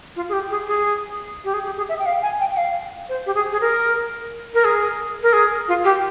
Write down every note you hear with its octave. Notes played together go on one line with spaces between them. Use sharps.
F4
G#4
G4
G#4
G#4
G4
G#4
G4
G#4
E5
G5
F5
G#5
G5
G5
F5
C5
G4
G#4
G#4
A#4
A#4
G#4
A#4
G#4
F4
G4